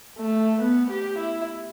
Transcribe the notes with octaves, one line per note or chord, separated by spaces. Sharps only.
A3
B3
G4
E4